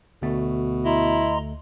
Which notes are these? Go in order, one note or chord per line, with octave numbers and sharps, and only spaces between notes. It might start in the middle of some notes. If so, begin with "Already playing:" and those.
D2 B2 A3
E4 D#5 A#5 C6